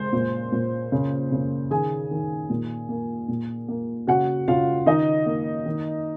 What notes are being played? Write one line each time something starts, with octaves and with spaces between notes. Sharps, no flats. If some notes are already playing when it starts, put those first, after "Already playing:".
Already playing: C#3 G#3 C5 C6
A#2
A#2
C#3
C#3
D#3 G#4 G#5
D#3
A#2
A#3
A#2
A#3
C#3 F#4 F#5
C#3 F4 F5
D#3 D#4 D#5
A#3
D#3